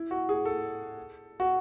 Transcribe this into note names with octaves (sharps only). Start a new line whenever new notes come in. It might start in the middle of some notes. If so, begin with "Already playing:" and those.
Already playing: E4
F#4
G#4
A4
F#4